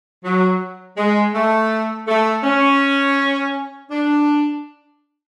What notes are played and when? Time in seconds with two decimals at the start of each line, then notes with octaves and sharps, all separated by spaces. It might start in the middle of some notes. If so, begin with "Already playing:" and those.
0.24 F#3
0.97 G#3
1.34 A3
2.08 A3
2.44 C#4
3.90 D4